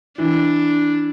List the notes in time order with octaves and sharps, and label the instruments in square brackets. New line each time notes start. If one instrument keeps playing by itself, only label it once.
[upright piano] E3 [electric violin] D4